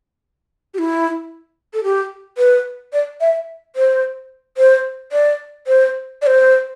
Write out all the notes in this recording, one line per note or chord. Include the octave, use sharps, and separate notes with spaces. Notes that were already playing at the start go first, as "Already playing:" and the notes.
G4
E4
A4
G4
B4
D5
E5
C5
C5
D5
C5
D5
C5